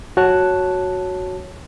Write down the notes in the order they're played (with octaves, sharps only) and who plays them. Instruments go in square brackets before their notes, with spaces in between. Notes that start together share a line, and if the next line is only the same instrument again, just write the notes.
[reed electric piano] F#2 F#4 C#5 A5 F#6